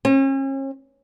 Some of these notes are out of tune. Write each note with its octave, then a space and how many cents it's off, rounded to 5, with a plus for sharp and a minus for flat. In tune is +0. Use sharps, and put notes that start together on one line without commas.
C#4 -40